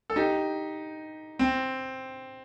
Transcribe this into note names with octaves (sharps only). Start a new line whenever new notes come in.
A4
D#4 G4
C4